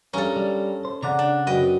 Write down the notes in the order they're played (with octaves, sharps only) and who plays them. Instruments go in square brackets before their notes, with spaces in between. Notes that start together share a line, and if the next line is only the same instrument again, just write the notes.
[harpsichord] G2 A#4 A#5 [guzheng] C#4 A4
[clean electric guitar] G3
C5
[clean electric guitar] C#3 D5 F#5 [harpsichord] A#5
[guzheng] D4
[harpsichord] F#2 B4 G5 [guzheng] D#5